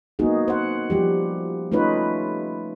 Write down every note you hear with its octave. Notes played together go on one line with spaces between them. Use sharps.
A#3 B3 D#4 F#4 G#4
C5 F#5
F3 G3 G4
A3 C#4 D#4 F4 B4 C#5